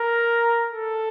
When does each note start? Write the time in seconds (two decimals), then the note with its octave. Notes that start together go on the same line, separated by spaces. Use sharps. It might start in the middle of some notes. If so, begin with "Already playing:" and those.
Already playing: A#4
0.71 A4